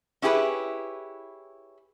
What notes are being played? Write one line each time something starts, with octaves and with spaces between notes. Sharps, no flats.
C#4 E4 G4 G#4 B4